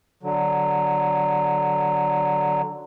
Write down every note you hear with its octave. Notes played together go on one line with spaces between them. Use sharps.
D3 F#3